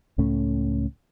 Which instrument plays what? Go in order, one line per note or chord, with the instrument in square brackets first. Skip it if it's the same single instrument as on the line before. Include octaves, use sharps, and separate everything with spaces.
[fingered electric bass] C#2 A2 A3 C#4